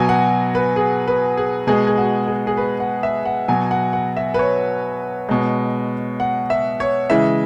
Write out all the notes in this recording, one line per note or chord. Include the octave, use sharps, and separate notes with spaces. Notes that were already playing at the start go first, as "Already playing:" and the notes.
Already playing: B2 F#3 G#5
F#5
B4
G#4
B4
G#4
B2 G#3 G#4
G#4
F#4
G#4
G#4
B4
F#5
E5
F#5
B2 F#3 G#5
F#5
F#5
E5
B4
C#5
B2 G#3
F#5
E5
C#5
C#3 E3 G#3 E5